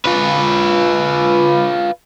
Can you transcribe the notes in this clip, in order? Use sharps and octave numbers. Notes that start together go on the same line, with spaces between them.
F4 B4